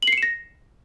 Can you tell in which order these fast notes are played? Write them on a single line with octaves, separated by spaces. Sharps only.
F#7 C7 C#7 E7 A#6